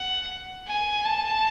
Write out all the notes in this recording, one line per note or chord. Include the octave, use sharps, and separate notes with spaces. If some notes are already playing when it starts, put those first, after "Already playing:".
Already playing: F#5
G#5
A5